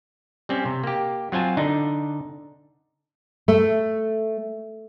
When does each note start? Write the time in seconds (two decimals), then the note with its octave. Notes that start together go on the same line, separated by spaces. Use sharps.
0.49 G3 C4 C#4
0.65 C3
0.84 A#3 G4
1.32 F#3 C4 F4 G#5 A5
1.57 D3 D4 D#4
3.48 A3